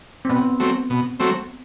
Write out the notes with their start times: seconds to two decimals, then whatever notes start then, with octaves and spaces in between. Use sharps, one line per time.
0.25 C4
0.29 B2 B3
0.60 F#3 A3 C4
0.90 B2
1.20 F#3 A3 C4